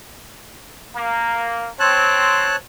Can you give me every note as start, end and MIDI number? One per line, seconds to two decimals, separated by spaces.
0.95 1.69 58
1.80 2.55 60
1.80 2.56 73
1.80 2.56 81
1.80 2.56 90